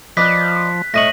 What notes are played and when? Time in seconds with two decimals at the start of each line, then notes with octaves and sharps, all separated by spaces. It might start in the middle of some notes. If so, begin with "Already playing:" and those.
0.17 F3 B4 D5 D#5 F#6 B6
0.94 A2 D#5 C#6 A#6 D#7 F#7